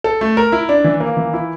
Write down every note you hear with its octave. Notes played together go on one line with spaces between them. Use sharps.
A4
A3
A#4
E4
D4
E3
A#3
E3
E4